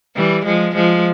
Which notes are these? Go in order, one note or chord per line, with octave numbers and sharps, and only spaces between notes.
E3 G3
F3 G#3
F3 G#3